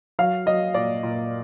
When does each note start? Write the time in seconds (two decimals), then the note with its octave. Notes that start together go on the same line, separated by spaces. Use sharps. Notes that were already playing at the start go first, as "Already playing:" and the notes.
0.19 F#3 F5
0.46 F#3 D#5
0.74 A#2 D5
1.03 A#2